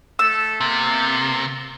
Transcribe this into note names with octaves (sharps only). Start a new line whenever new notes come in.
A3 A4 E6
C3 A#3 B3 A4